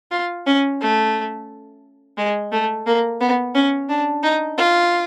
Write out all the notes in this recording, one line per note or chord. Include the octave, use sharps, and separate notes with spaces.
F4
C#4
A3
G#3
A3
A#3
B3
C#4
D4
D#4
F4